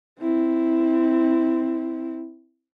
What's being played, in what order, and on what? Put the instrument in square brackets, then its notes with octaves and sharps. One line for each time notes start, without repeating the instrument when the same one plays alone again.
[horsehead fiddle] C4 E4